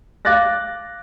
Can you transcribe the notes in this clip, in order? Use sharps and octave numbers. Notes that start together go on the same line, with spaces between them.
F5 D6 F#6 A6 A#6